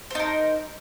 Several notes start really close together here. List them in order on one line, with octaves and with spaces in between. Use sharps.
C5 D#4 A#4